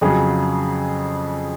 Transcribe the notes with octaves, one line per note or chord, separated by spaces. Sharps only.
F2 C#3 F#3 G#4